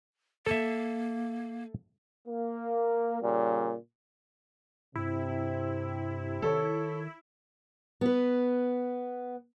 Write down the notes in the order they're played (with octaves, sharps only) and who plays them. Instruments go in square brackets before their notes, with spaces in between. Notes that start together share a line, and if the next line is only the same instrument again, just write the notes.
[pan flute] A#3 [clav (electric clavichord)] A4 E5
[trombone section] A#3
A#2 C#3 G3
[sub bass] G2 [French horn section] C3 [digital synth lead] E4
[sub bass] D#3 [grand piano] A4 C#5
[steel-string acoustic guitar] B3 B4